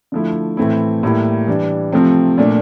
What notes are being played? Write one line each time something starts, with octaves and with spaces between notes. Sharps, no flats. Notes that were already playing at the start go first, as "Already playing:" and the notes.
D3 F3 A3 E4
A2 E3 A3 C4 E4
A2 G3 A#3 E4
E3 G3 D4
C3 F3 A3 C4
A#2 A3 D4